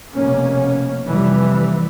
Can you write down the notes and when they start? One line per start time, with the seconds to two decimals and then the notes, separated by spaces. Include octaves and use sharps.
0.14 F1 B2 A#3 C#4
1.07 F1 E3 F3 G3